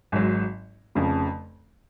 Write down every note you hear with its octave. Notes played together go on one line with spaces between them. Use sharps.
G#1 G#2 F#3
F1 F2 C#3 F3